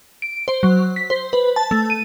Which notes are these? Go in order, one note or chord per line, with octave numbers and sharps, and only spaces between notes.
D7
C5
F#3
B6
C5
B4
A5
A3
D#7